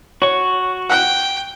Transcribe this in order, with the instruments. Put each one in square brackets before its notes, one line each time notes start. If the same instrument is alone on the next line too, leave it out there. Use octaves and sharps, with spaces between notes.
[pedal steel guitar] F#4 C#6 [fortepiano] C#5
[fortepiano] F#5 F#6 [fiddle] G5